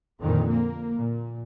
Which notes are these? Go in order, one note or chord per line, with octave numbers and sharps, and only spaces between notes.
F2 A#2 D3 D#3
A#3
A#2